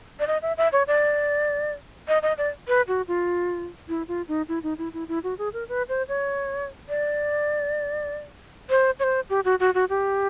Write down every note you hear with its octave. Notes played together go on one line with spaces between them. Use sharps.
D5
D#5
E5
E5
C#5
D5
D#5
D#5
D5
B4
F#4
F4
E4
F4
D#4
E4
D#4
E4
E4
E4
F#4
G#4
A#4
B4
C5
C#5
D5
C5
C#5
C5
G4
F#4
F#4
F#4
G4